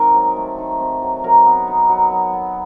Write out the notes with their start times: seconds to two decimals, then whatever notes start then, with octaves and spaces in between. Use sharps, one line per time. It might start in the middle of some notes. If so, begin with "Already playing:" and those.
Already playing: D#3 G#3 C4 D#4 A#4
0.14 F#3
0.36 A3
0.58 D#3
0.80 C4
1.02 F#3
1.24 F#3 A#4
1.46 B3
1.68 D#4
1.89 F#3
2.11 F#3
2.33 B3